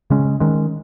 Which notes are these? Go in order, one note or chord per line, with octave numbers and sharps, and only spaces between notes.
C#3 G#3 C#4
D#3 G#3 C#4